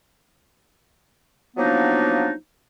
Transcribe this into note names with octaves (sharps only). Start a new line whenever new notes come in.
F3 F#3 A#3 B3 D4 D#4